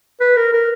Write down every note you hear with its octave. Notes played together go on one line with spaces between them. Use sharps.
B4
A#4
A#4